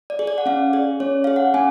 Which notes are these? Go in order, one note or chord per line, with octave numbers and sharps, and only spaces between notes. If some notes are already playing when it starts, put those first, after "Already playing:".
D5
G#4
D5
F#5
C#4 F5
G#4 D5
C#4 C#5
G#4 F5
F#5
C#4 G#5